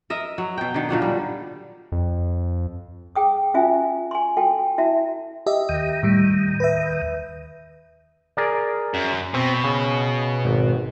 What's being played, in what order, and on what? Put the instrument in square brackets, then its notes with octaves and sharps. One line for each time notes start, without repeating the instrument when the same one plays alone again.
[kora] A#4 D#5 E5
F#3
B2 G5
D3 D#3
A#2 D3 F#3 D4
G3
[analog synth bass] F2
[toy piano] G#4 G5 D#6
C#4 F4 F#4 E5 G#5
G#5 C6
F#4 A4 G5
E4 F#4 E5 A5
[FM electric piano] G4 D#5 E5
[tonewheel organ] D#2 D#3
[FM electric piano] A2 G3
B4 E5
[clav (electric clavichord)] G#4 A#4 D5
[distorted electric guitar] F#2
[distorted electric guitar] B2 [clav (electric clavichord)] C4
[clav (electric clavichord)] C#3
G#1